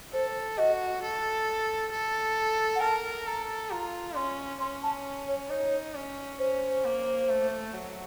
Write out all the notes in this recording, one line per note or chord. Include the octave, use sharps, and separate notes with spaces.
A4 C5
F#4 D#5
A4
A4
F#5
A#4 A5
A4 A#5
F4 A#5
C#4 C6
C#4 C6
A5
C#5
D#4 C#5
C#4
C#4 C5
A#3
A3
F#3